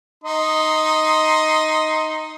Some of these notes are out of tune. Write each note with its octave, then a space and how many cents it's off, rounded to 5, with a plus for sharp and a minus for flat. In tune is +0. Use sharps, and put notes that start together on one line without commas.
D#4 +0 D#5 +10 C6 +0